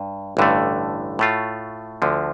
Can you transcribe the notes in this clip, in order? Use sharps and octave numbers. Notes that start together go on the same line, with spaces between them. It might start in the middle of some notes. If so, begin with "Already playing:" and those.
Already playing: G2
A1 G2 D3 A3
A2 A3 F4
D2 D3 F3